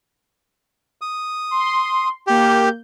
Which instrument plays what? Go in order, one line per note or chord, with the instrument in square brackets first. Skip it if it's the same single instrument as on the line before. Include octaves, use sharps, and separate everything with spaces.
[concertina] D#6
[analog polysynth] C6
[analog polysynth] A#3 G6 [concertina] G4